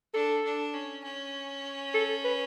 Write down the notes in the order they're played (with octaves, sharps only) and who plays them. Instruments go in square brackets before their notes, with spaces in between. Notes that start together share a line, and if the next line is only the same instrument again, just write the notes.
[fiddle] D4 [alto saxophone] A4
[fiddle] D4
C#4
C#4
[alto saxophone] A4
B4